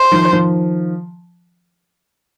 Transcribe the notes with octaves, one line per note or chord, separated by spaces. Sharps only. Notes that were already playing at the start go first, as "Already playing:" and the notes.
Already playing: C5
D#3 F3
D#3 F3